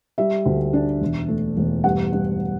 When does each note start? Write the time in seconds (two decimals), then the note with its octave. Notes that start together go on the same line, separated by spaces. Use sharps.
0.18 G3 E5
0.46 D2
0.73 D4
1.01 E1
1.28 A3
1.57 E1
1.84 G2 F#5
2.13 G2